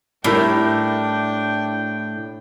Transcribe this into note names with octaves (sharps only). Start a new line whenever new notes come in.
A2 G3 D4 E4 A#4 G5